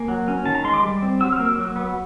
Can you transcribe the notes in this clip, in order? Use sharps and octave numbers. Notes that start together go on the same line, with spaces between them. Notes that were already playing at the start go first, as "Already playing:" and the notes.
Already playing: A#3 G#5
F#3
C#4
D#3 A5
A#5
G#3 C6
D6
G3
C4
F#3 E6
F6
A#3
E6
F#3
B3